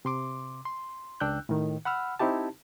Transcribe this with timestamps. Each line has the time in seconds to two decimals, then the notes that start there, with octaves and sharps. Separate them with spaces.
0.05 C3 C6 D6
0.65 C6
1.20 C#2 D4 G5 E6 F#6 G6
1.49 A2 D#3
1.85 F#5 B5 E6 F6
2.19 C4 D#4 E4 G4 A5